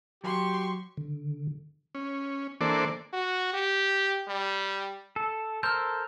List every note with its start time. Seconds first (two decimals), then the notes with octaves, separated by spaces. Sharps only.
0.24 F#3 G4 C6 C#6
0.97 D3
1.95 C#4
2.61 E3 A#3 D4 A4 C5 D5
3.13 F#4
3.54 G4
4.28 G3
5.16 A4
5.63 A4 A#4 C5 F6 G6